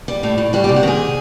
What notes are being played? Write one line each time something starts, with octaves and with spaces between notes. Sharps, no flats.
G3
A2
A2
G3 F#4
G4
C3
F#4
D#3 G#4